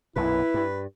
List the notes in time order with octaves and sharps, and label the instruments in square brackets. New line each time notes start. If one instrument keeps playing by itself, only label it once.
[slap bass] B1 F#2 A#2 [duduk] E4 [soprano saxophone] B4
[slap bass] G2